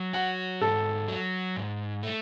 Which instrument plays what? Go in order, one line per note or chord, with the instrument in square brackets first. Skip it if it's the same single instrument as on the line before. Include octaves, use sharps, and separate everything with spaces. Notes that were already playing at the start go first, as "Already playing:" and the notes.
Already playing: [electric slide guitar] F#3
[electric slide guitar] F#4 [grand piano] F#5
[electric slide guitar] G#2 [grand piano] A4
[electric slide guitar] F#3
G#2
A3